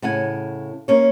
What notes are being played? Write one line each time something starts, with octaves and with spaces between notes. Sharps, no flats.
A2 C#3 F#5 G#5
A#3 C#4 C#5